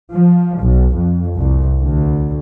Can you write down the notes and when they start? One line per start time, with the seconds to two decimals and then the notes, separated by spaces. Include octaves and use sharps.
0.11 F3
0.60 B1
0.94 F2
1.39 C2
1.80 D2